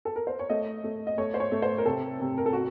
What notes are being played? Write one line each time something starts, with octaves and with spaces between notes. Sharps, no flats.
A4
A#4
C5
C#5
A3 D#5
A3
D#5
A3 C#5
C5
C#5
A3
C5
A#4
C3 A4
C3
A#4
A4
F#4